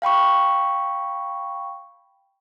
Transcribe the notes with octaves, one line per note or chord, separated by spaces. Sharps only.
F5 G5 B5 C#6